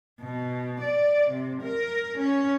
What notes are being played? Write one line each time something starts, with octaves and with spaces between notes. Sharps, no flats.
B2
D5
C3
A#4
C#4